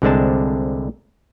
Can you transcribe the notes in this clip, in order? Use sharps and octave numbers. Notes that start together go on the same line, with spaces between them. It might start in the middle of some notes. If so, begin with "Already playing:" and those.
C2 D3 G#3 C4 D4 A5